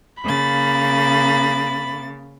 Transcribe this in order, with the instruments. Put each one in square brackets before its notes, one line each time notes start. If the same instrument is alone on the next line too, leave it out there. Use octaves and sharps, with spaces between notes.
[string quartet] C#3 A#3 A6 [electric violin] B5